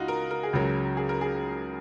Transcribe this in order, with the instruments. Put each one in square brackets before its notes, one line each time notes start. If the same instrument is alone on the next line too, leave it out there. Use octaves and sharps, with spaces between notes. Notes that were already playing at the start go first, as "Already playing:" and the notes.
Already playing: [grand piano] C#2 [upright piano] D#4 F4 F#4
[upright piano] A#4
A#4
G#4
[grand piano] C#2 C#3 F#3 [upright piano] A#4
[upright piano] G#4
A#4
G#4